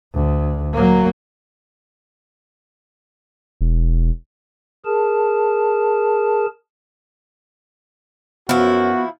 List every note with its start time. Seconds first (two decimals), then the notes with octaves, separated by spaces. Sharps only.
0.14 D2
0.74 F#3 A#3
3.61 E1
4.85 G#4 A#4 A5
8.49 F#2 F3 B3 E4 F#4